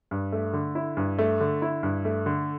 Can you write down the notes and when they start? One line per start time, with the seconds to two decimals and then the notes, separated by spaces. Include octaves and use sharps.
0.11 G2
0.32 A3
0.53 D3
0.75 E4
0.97 G2
1.18 A3
1.40 D3
1.62 E4
1.83 G2
2.05 A3
2.26 D3